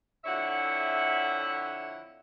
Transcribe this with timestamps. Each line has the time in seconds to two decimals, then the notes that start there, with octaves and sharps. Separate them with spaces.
0.24 F2 D3 E4 C#5 E5 F#5